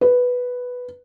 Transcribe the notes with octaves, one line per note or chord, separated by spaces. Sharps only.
B4